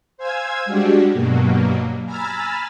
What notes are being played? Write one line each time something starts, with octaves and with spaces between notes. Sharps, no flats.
C5 F5 G#5 E6 G#6
G3 G#3 D4 F#4 G4
G2 B2 F#3 A#3
G#5 A#5 B5 E6 F6 A6